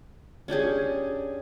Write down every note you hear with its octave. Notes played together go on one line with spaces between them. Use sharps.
C#4 D4 G4 G#4